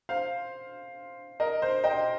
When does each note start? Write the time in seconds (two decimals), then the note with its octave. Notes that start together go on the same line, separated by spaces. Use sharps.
0.09 C5 F5
1.40 A#4 D#5
1.62 C5
1.84 D#5 G5